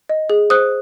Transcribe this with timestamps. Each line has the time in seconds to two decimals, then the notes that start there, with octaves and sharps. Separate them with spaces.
0.09 D#5
0.30 G#4
0.50 C5 D#6 F#6